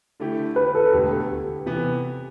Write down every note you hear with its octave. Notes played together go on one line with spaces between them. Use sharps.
D3 A3 E4 G4
B4
A4
E1 D2 D3 A3 G4
C3 E3 B3